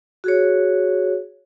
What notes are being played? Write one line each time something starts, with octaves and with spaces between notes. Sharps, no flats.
F#4 G#4 C#5